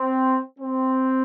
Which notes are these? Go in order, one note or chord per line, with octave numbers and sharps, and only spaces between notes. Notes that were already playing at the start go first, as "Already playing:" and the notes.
Already playing: C4
C4